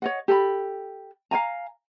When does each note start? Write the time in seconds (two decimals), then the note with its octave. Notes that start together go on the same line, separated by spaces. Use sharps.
0.02 C#5 D#5 F#5
0.28 G4 A4 A5 B5
1.31 F5 G5 G#5 A#5